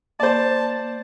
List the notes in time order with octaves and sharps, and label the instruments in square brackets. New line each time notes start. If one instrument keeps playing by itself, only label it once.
[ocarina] A#3 [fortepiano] C5 D5 [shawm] A5